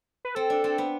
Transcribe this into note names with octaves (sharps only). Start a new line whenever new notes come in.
B4
C4 A4
D4
C4
B3